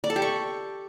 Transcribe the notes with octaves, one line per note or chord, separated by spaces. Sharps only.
D5
A4
G4
C#6